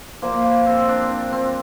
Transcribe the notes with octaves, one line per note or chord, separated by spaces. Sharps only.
A#2 F3 A#3
A#3
C4
D4
D4
C4